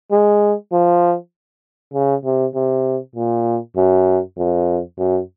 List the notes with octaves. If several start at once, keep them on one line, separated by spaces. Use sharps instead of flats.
G#3
F3
C#3
C3
C3
A#2
F#2
F2
F#2